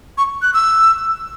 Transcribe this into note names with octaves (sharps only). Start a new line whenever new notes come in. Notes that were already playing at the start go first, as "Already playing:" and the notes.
C#6
F#6
E6